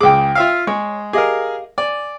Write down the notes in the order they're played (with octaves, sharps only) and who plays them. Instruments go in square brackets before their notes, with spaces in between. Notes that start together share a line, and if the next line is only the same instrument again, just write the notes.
[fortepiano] C#2 D6 [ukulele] G#4 G5
[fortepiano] F4 E5 F5
[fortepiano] G#3 [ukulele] C#5
[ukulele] G4 D#5 F5 [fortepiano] G#4 A#4
[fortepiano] D5 [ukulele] G#5